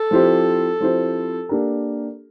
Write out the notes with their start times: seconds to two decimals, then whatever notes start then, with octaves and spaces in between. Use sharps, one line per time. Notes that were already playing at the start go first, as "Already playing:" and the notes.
Already playing: A4
0.11 F3 C4 E4 G4 C5
0.80 F3 C4 E4 G4 C5
1.49 A#3 D4 G4 A#4